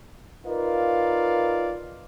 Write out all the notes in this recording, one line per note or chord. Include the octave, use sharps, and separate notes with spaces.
D#4 F4 A#4 B4 D5 F5